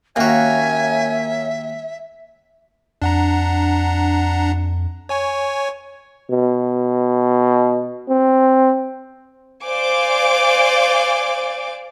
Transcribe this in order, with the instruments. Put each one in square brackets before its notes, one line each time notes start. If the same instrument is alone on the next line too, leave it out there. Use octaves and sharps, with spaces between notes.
[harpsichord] D#2 F#4 [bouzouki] A#3 C#4 [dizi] E5 [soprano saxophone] G#5
[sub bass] F2 [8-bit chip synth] D4 F#5 A#5
[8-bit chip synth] C#5 G#5 C#6
[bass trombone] B2
C4
[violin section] C5 D5 F5 G#5 D6